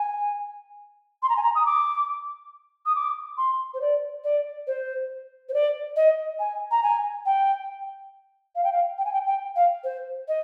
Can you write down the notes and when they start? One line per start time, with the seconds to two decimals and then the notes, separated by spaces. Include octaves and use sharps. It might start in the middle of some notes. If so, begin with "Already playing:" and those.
Already playing: G#5
1.23 C6
1.29 A#5
1.37 G#5
1.43 A#5
1.55 D#6
1.66 D6
2.86 D#6
2.95 D6
3.38 C6
3.74 C5
3.81 D5
4.24 D5
4.67 C5
5.49 C5
5.54 D5
5.96 D#5
6.39 G#5
6.71 A#5
6.83 G#5
7.26 G5
8.56 F5
8.64 G5
8.72 F5
8.98 G5
9.05 G#5
9.13 G5
9.27 G5
9.56 F5
9.84 C5
10.28 D#5